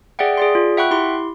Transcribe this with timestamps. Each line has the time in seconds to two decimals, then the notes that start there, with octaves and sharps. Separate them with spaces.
0.19 G#4 D5 E5 F#5 G5
0.37 G#4 D5 C6
0.55 F4
0.77 E5 F#5 G5 B5 C#6 F#6
0.91 E4 G4 C6